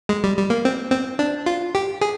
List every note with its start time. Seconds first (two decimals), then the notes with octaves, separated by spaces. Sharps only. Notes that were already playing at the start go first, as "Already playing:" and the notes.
0.09 G#3
0.24 G3
0.37 G3
0.50 A#3
0.65 C4
0.92 C4
1.19 D4
1.46 F4
1.75 G4
2.01 G#4